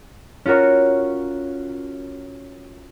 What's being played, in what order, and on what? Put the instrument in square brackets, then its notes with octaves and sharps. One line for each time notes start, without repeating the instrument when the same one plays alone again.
[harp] C#4 F4 F#4 A#4 C#5